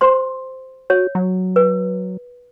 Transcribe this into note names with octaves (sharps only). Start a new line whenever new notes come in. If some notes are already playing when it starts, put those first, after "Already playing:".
G4 C5 C6
F#4 C#5
F#3
B4